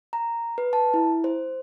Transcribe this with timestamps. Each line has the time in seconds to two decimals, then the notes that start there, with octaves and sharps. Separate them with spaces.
0.13 A#5
0.58 B4
0.73 A5
0.94 E4
1.24 C5